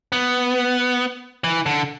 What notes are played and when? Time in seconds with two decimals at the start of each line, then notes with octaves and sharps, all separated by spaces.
0.12 B3
1.44 E3
1.66 D3